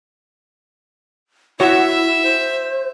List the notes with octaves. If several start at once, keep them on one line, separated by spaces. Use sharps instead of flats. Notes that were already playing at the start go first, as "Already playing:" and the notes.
E4 F#4 C#5 E5
C5